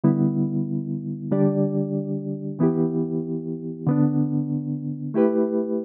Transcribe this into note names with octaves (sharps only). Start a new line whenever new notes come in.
D3 G3 B3 E4
D3 G3 D4 G4 D5
E3 B3 E4 G4
D3 B3 D4
A3 E4 G4 B4